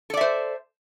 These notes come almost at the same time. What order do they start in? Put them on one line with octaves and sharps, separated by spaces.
A4 D5 E5 C5